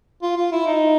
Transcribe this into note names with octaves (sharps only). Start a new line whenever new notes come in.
F4
F4
E4
D#4